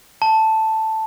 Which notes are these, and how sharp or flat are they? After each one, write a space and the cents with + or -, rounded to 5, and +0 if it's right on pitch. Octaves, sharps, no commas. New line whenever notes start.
A5 +0